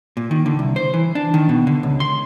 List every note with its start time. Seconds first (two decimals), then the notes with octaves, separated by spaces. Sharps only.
0.17 A#2
0.31 D#3
0.46 D3
0.59 C2
0.76 C5
0.94 E3
1.15 D4
1.34 D#3
1.49 B2
1.67 D3
1.83 C#2
2.00 C6